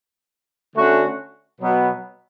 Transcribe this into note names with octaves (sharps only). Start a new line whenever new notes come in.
D3 A3 C#4 F#4
B2 F#3 B3